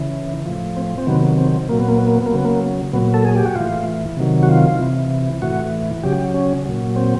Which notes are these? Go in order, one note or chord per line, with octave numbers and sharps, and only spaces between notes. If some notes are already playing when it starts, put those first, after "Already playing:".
Already playing: C#3 E3
A2 F3
C4
C4
C3 D#3 F#3 B3
C4
A#2 F#3 A#3
B3
A#3
B3
A#3
B3
A#3
C#3 F#3 B3
A#3
A#2 F#3 B3
A4
G#4
G4
F#4
A2 E3 F4
C3 D#3 F#3
F#4
F4
C3 E3
A2 E3 F#4
C#3 F#3 G4
C#4
A#2 F#3
C4